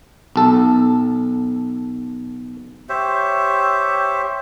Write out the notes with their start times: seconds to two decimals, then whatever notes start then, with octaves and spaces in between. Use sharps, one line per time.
0.36 B1 A4
2.89 G4 C5 C#5 E5